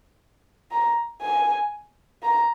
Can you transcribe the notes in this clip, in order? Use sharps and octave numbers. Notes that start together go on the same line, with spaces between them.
A#5
G#5
A#5